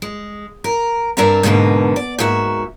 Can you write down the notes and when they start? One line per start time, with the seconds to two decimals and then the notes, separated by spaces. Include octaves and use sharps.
0.02 G#3
0.64 A#4
1.17 G2 C4 A#4 D5 E5 A#5
1.43 G#2 B2 D3 A#3 B4
1.96 D5
2.18 G#2 A#3 F#4 E5